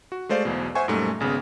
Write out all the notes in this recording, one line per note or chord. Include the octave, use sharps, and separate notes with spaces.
F#4
G#3 A3 C5 D5 F5
B1 E2 B2
C5 E5 F#5 G#5 C#6
F#2 A#2 G3 A3 D#4
G#1 C#3 B3